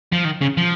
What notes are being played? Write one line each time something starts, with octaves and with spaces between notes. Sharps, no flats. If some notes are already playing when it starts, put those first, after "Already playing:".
F3
D#3
C#3
F3